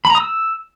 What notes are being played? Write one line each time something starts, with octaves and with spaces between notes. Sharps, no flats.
B5
A#5
D#6
E6